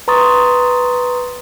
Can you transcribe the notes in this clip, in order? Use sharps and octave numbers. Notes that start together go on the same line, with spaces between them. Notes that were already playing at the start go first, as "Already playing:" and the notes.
B4 A#5 C6 C#6 D#6 A6